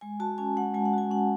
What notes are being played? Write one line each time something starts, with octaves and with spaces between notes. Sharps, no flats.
G#3 G#5
F#4 A5
C#4 G#5
G#3 F#5
G#3 G#5
F#5
F#4 G#5
C#4 F#5